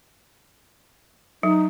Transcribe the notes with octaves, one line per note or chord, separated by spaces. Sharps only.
F#3 D#4